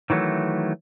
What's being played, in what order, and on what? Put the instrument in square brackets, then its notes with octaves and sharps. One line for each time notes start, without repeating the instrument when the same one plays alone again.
[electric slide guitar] D#3 E3 F#3 A3